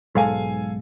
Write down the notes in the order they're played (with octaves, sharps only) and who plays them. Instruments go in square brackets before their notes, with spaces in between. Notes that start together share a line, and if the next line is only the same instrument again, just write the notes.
[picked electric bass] B1 G#2 G#3 [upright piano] A4 F5 G#5